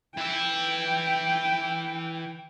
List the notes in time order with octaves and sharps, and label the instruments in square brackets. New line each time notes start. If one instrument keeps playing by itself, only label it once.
[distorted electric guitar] E3 E5 [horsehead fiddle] G5